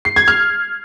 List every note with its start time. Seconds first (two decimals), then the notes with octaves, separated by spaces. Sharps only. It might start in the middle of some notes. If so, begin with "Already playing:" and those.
0.05 C7
0.16 G#6
0.28 F6